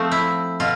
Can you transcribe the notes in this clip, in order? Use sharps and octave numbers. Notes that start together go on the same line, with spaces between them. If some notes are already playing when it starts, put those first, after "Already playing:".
Already playing: F3 A3 C4
E4
B2 F4